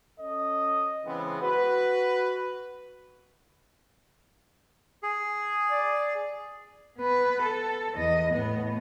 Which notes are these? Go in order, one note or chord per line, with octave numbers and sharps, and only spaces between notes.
C#4 A4 D#5
C#3 E3 G#3 B3 C4
F#4 B4
G#4
D5
B3 B4
A4
E2 D#5
A2 B3